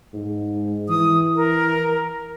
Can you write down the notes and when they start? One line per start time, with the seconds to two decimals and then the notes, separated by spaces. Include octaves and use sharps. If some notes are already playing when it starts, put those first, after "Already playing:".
0.14 G#2
0.89 E3 D#6
1.35 A#4